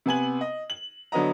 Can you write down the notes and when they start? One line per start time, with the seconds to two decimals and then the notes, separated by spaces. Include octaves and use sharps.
0.06 C3 B3 G#5 F#7
0.41 D#5
0.70 F#7
1.12 D3 F#3 B3 D#5 A#5